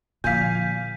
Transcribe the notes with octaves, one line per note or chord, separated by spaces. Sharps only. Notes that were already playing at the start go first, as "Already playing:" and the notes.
A#2 D3 F3 F5 G#5 G6 B6